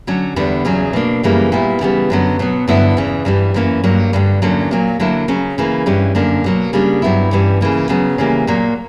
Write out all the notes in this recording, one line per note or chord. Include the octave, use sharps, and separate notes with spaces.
D3 F#3 C#4
E2 D3 G3 B3
E2 C#3 F#3
B2 A#3 D4
F#2 C#3 E3 G3 A#3
A#2 G3 B3 E4
C#3 E3 G3 B3
F#2 D3 F#3 B3
B2 F#3 B3
G2 D3 F#3 B3 E4
E2 C#3 E3
G2 E3 G3
F#2 E3 A#3 C#4
G2 F#3 A#3
G2 D3 G3
E2 D3 F#3 A#3 C#4
A#2 F#3 A#3
D3 F#3 A#3 E4
C#3 F#3 C#4
C#3 E3 A#3
G2 E3 G3 C#4
F#2 D3 A#3 D4
B2 F#3 A#3
C#3 G3 A#3 D4
G2 F#3 B3 E4
G2 E3 G3 C#4
C#3 E3 A#3
C#3 F#3 B3
C#3 E3 G3 A#3
A#2 F#3 A#3